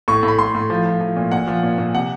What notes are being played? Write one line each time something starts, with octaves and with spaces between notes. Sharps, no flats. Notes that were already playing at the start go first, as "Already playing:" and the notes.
A2 C#6
A2
B5
A2 C6
A2
F3
F3
F3
A#2
A#2 F#5
F3
A#2
A#2
C3 F#5